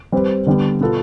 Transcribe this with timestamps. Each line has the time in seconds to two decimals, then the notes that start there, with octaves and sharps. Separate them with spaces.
0.12 G3 C4 G4 B4
0.46 D3 G3 B3
0.80 B2 B3 F4 A4